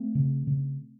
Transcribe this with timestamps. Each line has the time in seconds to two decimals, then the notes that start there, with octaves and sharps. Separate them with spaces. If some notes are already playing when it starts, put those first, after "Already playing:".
Already playing: A3 C4
0.15 C#3
0.47 C#3